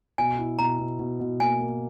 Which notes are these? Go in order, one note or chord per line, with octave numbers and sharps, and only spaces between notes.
B2 G#5
E4
B2 A#5
B2
B2
B2
A#3 G#5
A#3